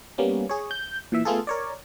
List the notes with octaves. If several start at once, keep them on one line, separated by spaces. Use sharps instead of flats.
G3 A#3 B3 C#4
G#4 C#5
G6
A#2 E3 E5
A3 B3 F4 G#4 A4
A#4 C#5 D5